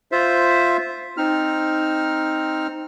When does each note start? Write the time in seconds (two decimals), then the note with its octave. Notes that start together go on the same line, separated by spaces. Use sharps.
0.12 F4 C5 E5
1.17 C4 D#4 F6